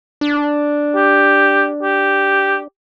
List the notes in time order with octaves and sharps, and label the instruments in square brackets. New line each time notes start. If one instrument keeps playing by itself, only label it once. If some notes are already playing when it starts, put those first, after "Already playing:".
[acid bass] D4
[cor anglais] G4
G4